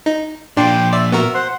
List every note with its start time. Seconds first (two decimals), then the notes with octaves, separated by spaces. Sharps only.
0.06 D#4
0.57 A#2 F3 D4 G5 C6 D6
0.93 D5 E5
1.12 B3 F#4 A#4 E5
1.34 C5 F#5 C6